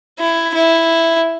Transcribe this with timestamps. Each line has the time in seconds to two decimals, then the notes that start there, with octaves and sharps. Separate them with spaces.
0.19 E4
0.55 E4